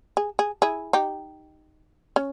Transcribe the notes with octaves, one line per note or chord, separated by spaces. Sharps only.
G#4
G#4
E4 G#4
D#4 G4
C#4